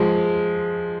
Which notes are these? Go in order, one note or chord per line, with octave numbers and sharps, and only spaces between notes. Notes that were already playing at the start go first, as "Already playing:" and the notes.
Already playing: F3 G#3